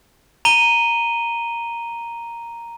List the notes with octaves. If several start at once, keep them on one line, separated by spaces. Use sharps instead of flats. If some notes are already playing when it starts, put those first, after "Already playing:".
A#5 D#7 G7